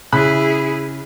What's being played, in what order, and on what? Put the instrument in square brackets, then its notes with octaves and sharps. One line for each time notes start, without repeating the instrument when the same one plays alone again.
[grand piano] C#3 B5 F#6 [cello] E4 G#4